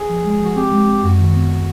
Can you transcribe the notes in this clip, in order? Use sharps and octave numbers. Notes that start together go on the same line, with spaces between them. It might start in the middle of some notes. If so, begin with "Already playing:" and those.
Already playing: G#4
F3
G#3
F3 F#4
C4 G4
G#3
C4
F#2 F#4
D#3
B3